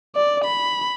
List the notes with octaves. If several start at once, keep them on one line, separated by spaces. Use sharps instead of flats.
D5
B5